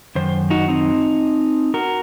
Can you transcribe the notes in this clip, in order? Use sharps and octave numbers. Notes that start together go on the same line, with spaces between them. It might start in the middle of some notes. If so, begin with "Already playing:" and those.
F#2 D#3 C5
D#4 F#4
C4 D#4
F#4 A#4